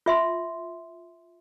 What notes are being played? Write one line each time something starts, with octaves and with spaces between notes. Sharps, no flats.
F4 E5 C6